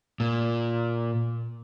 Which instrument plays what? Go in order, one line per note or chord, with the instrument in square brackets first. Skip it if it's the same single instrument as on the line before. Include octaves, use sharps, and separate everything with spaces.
[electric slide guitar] A#2